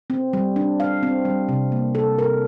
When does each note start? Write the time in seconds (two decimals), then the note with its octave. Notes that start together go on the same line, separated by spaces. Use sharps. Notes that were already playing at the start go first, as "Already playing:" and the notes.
0.10 C4
0.33 G3
0.56 D4
0.80 F5
1.03 C4
1.25 G3
1.49 C3
1.72 A#3
1.95 A4
2.18 A#4